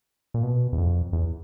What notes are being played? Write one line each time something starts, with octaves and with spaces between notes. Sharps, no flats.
A#2
B2
E2
F2
E2